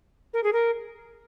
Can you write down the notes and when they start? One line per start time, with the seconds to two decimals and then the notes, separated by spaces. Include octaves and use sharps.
0.34 A#4
0.44 G#4
0.53 A#4